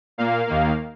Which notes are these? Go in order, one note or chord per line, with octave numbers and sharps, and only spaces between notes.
A#2 A#3 F5
D#2 D#3 A#3